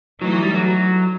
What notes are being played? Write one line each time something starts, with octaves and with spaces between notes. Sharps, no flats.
E3 F#3 A3 D#4
F#3
G3
F#3